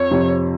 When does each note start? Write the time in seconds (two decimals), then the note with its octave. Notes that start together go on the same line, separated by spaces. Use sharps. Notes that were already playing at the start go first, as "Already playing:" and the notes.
Already playing: F2 C4 C#5
0.11 F2 C3 F3 C4